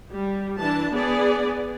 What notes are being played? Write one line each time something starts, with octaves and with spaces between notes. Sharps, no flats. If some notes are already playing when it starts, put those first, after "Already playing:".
G3
E3 D4 A5
B3 G#4 D5